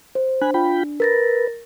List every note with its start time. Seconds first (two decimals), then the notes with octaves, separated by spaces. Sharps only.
0.15 C5
0.41 D4 G#5 B5 F#6
0.54 F4 G5 B5
1.00 A#4 B4 A6 A#6